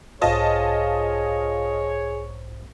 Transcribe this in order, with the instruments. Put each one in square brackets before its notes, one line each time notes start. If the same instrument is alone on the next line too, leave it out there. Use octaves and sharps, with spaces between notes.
[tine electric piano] B1 G#2 C5 [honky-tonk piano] F4 D#5 A5 [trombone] G#4 [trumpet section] C#5